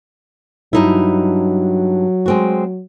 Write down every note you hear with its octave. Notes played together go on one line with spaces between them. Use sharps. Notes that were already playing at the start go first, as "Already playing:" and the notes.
G2 F#3 D#4 E4
G#3 C4 F#4